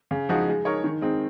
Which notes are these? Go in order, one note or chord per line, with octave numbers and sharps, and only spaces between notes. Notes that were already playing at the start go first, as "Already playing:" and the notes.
C#3
F3 G#3 D#4 F#4
G#3
D#4 A#4 C#5
D#3
G#3 C4 D#4